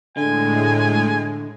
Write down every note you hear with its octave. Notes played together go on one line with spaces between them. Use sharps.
A2 D3 G#3 G#5